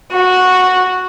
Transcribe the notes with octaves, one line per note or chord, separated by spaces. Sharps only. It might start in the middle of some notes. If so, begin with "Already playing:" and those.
F#4